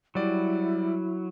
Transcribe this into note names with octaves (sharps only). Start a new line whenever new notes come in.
F#3 G3 E4 D5